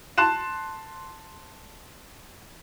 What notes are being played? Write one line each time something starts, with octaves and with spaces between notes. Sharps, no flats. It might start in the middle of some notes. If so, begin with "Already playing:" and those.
A5 C6 F#6 E7